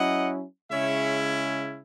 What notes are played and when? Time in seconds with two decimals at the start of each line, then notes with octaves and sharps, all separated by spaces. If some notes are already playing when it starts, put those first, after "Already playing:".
Already playing: F#3 C#4 E4 D#5 F#5
0.71 C#3 G#3 C#4 E4 C#5 E5